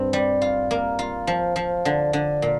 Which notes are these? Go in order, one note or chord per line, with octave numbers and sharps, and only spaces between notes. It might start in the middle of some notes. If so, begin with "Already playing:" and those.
Already playing: G2 C4
G3
F4
A#3
F4
F3
F3
D3
D3
A#2